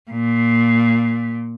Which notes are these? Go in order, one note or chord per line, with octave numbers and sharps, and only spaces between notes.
A#2